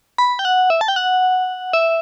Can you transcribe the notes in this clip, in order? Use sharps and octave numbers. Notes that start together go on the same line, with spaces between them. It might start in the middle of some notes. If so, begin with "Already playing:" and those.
B5
G5
F#5
E5
A5
G5
F#5
E5